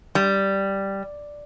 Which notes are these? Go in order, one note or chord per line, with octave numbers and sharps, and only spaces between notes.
G3